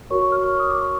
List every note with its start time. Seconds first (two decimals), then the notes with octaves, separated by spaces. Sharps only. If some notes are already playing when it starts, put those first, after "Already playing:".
0.10 F#4 A#4 C#5 C#6
0.21 C#6
0.32 F6
0.44 C#6
0.60 D#6
0.71 D6
0.81 C#6